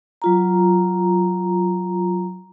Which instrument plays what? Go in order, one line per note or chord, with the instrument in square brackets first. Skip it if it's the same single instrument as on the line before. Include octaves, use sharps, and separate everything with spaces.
[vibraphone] F#3 F4 A#5